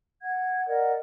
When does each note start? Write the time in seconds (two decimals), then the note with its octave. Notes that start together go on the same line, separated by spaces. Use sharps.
0.22 F#5 G#6
0.67 A#4 D5 D#5 F#5